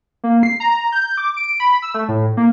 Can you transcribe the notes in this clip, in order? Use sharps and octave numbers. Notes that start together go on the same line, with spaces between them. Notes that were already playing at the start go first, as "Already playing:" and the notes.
A#3
C7
A#5
G6
D6
D7
B5
E6
A3
A2
A#3